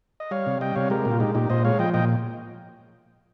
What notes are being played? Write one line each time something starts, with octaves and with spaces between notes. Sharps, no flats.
D#5
G3 C#5 F5
C3
G3 D#5 G5
C3 C#5 F5
G#3 G4 A#4
A#2
F4
G#3 D#4 G4
A#2 D#4 G4
A#2 C5 D#5
G#3 C#5 F5
F3 D#5 G5
A#2 D#5 G5